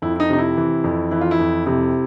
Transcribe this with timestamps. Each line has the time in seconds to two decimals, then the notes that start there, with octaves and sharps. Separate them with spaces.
0.02 F2 E4
0.16 E4
0.20 D#4
0.30 C3 D#4
0.38 E4
0.57 E3
0.84 F2
1.11 E3 E4
1.21 F4
1.31 E4
1.39 F2
1.66 C3 E4